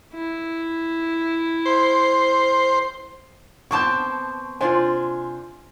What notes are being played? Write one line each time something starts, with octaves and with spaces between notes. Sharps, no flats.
E4
C5
B2 C4 A5 C#6 D6 G6
C3 D4 F4 C5 G#5